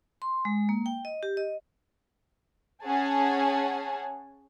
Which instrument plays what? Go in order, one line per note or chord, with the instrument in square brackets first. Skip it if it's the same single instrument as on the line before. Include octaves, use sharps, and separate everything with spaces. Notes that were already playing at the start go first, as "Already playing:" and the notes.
[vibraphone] C6
G#3
A#3
G5
D#5
G4
D#5
[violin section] C#4 G#4 C#5 F#5 G#5 A5